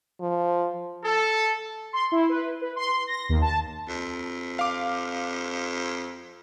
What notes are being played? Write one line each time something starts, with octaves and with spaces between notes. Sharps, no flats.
F3
A4
C6
E4
B4
B4
C6
A#6
D#2
A5
F2
F5 D6